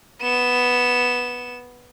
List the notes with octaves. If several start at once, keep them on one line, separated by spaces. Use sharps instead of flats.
B3 E7